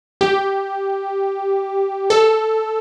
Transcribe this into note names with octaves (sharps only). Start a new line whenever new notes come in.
G4
A4